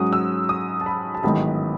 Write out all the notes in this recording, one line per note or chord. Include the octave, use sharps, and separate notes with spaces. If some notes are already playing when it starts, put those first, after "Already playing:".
Already playing: G#2 F#3 C#4 D#6
E6
D#6
A5
B5
A5
A1 G#2 D#3 F#3 B3 B5